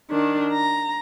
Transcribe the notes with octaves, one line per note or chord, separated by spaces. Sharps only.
D#3 D4
A#5